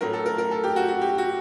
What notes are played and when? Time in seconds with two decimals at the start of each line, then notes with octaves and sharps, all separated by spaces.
0.01 A2 F#3 A3 A#4
0.13 A4
0.26 A#4
0.38 A#4
0.51 A4
0.64 G4
0.76 F#4
0.88 F#4
1.02 G4
1.18 F#4